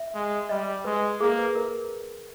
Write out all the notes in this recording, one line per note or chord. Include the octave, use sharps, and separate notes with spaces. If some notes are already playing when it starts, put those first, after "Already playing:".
Already playing: E5
G#3
G3 D#5
G#3 B4
A#3 G#4
B4
A#4